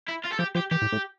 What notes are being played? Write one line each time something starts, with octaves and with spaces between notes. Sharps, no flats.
E4
F4
A4
F3 G4
F3 G4
E3 G4
A2
A2